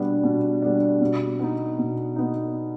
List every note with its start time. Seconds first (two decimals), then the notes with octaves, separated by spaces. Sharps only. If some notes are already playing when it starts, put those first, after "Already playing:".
Already playing: B2 G3 B3 D4
0.23 B2
0.62 G3 B3 D4
1.01 B2
1.39 B3 D#4
1.78 B2
2.16 B3 D#4